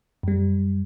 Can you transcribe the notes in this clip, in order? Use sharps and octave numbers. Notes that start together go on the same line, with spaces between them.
F#2 G3